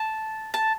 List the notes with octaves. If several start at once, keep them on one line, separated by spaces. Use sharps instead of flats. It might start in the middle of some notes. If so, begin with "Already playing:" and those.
Already playing: A5
A5